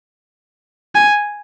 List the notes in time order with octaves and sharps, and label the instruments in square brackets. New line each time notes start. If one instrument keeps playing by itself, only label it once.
[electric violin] G#5